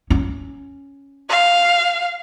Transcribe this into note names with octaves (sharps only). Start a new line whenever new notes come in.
C#4
F5